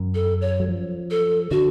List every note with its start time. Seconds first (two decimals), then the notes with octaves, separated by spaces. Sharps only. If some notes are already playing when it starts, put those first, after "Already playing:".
Already playing: F#2
0.15 A4
0.41 C#5
0.60 F#3
0.68 F3
1.11 A4
1.51 D3 F#4